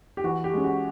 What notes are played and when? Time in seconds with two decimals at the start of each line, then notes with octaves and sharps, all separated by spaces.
0.17 G4
0.24 E3 F#4
0.44 G4
0.53 G#3 C#4
0.64 F#4